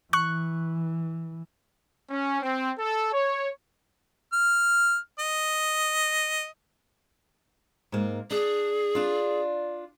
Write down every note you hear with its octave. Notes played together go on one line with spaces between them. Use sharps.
E3 C#6 F#6
C#4
C4
A4
C#5
F6
D#5
G#2 A#3
D4 G#4
D4 F4